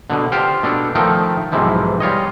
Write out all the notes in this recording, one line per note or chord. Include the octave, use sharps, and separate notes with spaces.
B2 D3
F4 G4 C5 F5 G5
B2 D4 A4
D#3 F3 A3 D#4 G5
B1 G#2 C3 E3 F3
G3 F4 C#5 D#5